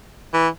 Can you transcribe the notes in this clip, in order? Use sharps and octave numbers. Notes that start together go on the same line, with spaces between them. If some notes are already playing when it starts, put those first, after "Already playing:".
E3